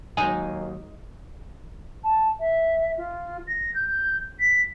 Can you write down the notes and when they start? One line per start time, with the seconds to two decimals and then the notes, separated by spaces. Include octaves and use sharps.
0.17 D#2 F#3 G#3 D#4 G#5
2.04 A5
2.40 E5
2.98 F4
3.47 A#6
3.75 G6
4.40 B6